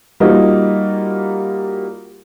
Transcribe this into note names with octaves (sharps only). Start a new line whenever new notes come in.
G3 A#3 D#4 F4 F#4